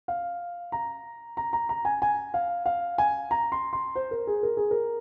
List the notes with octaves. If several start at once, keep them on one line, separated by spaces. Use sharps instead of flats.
F5
A#5
A#5
A#5
A#5
G#5
G#5
F5
F5
G#5
A#5
C6
C6
C5
A#4
G#4
A#4
G#4
A#4